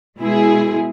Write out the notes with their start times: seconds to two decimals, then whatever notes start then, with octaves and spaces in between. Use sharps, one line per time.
0.19 B2 G#3 E4 G#4